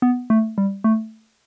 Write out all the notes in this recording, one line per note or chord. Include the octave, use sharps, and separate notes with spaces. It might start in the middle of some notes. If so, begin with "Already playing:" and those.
B3
A3
G3
A3